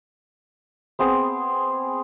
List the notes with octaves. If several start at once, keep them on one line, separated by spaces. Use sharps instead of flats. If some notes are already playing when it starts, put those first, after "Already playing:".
B3 C4 G#4